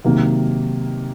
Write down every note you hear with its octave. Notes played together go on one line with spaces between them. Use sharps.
C3 D#3 F#3 A#3